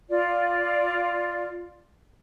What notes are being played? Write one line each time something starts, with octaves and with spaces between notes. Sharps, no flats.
F4 D5